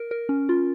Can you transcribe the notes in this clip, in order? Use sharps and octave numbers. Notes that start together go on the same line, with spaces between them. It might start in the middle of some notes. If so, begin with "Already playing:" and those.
Already playing: A#4
A#4
C#4
F4